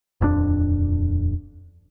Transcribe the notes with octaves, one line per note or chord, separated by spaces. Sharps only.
D#1 F2 F3 D4